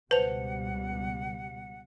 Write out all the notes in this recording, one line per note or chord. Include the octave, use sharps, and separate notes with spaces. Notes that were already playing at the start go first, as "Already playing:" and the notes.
C#2 B2 G3 B4 C5 F#5 A5 F7